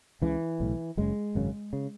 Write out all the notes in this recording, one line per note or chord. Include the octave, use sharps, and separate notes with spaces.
C#2 C#3 E3
B1 A2
F#1 F#2 C#3 G#3
G#1 F#2 C#3
C#3